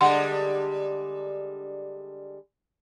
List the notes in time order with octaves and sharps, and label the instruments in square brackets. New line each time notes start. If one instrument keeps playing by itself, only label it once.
[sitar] D3 G3 G#3 [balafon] F#5 C6